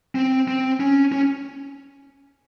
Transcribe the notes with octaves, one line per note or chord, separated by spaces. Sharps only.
C4
C4
C#4
C#4